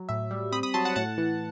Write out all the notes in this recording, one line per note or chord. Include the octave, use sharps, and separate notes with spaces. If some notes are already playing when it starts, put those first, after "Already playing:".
Already playing: F#3
A2 E5
G3
C4 B5 D#6
B5 D#6
F#3 A5 C6
F#5 A5
A2 F#5 A5
E3